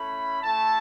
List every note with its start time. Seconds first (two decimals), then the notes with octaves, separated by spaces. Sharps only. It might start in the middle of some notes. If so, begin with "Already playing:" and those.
Already playing: A3 C#4 E4 B5
0.43 A3 E4 A5